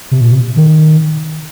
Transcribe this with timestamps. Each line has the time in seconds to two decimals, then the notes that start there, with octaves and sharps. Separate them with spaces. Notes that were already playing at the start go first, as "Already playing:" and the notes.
0.11 C3
0.21 A#2
0.32 C3
0.56 D#3